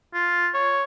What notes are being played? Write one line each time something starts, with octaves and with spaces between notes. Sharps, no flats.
F4
C#5